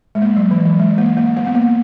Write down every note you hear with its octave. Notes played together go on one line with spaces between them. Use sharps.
G#3
A#3
F#3
E3
F#3
G#3
A#3
A#3
A#3
B3
A#3